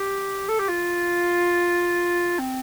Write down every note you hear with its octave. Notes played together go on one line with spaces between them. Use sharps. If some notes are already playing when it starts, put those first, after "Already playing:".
Already playing: G4
A4
G4
F4
C4